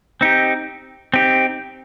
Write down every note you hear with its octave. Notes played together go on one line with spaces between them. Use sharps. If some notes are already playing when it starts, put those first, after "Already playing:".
C4 D#4 G4
C4 D#4 G4